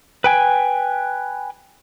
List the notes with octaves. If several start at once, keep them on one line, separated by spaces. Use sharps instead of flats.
B4 G5 G#5